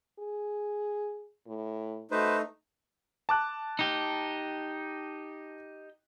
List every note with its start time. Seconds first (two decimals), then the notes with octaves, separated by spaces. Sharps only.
0.19 G#4
1.47 A2
2.11 A3 D#4 F#4 B4 C5
3.29 A5 D6 F#6
3.79 D#4 G4